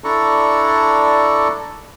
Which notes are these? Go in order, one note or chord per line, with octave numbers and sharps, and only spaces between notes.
D4 E4 A4 D5 A#5 C#6